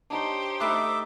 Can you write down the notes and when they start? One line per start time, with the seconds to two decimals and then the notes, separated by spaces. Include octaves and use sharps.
0.10 D4 D#4 G4 C5 C#5
0.60 A3 D#4 E5 B5 C6 D6 D#6 F#6